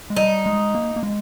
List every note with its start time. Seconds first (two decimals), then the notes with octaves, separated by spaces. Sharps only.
0.10 G#3
0.16 G3 D#4
0.46 G#3
0.75 A#3
0.96 A#3
1.03 G#3